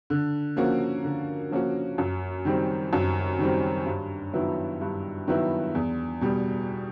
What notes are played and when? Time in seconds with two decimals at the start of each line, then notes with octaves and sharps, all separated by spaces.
0.10 D3
0.56 F3 A#3 C#4 F#4
1.04 D3
1.51 F3 A#3 C#4 F#4
1.98 F#2
2.45 D#3 G3 C4
2.93 F#2
3.39 D#3 G3 C4
3.86 G2
4.33 D#3 F#3 B3 E4
4.81 G2
5.27 D#3 F#3 B3 E4
5.75 E2
6.21 B2 G3